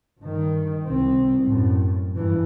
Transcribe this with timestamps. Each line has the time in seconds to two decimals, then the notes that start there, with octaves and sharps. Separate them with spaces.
0.20 G2 D#3
0.86 C2 C4
1.44 F#2 A2
2.15 G2 E3